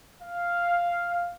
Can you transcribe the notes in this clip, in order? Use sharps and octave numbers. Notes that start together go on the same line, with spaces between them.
F5